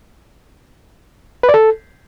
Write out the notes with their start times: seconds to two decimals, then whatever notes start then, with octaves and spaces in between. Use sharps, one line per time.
1.43 B4
1.49 D5
1.54 A4